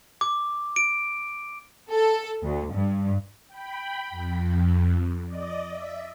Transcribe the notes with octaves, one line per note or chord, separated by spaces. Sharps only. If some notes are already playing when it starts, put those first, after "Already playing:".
D6
D7
A4
D2
G2
G5 B5
F2
D5 D#5
E5